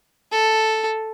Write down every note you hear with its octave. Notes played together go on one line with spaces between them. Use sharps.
A4